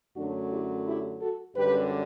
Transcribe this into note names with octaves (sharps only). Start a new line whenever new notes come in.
F#2 D3 F#3 A3 D4 F#4
E4 G4
E4 G4
F#4 A4
F#2 D3 G3 G4 B4